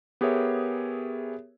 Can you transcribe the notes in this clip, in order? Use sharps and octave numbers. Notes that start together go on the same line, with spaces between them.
B3 G4 G#4 A#4 C#5 E5